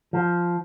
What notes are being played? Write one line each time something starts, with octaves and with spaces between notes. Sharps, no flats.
F3